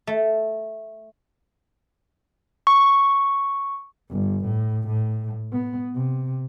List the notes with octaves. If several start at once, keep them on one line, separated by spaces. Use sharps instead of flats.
A3
C#6
G1
A2
A2
B3
C3